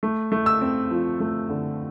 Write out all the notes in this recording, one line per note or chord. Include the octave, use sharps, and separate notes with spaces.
A3
A3
E6
C4
F3
A3
D3